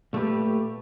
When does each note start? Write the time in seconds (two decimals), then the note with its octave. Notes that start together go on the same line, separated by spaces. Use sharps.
0.13 A#2 A3 F#4 G4 B4